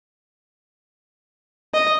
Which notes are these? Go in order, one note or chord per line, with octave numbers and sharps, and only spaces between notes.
D#5